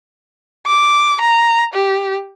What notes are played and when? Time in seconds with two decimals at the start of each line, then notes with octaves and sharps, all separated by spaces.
0.67 D6
1.21 A#5
1.74 G4